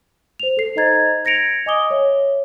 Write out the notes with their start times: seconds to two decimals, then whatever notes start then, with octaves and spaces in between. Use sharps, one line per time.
0.39 C5 F7
0.57 A4 C7
0.76 D#4 C5 D#5 A#5 G#6 A6
1.25 G#6 A#6 C#7 D7 F7
1.66 D#5 G#5 D6 D#6 G7
1.91 C#5 E5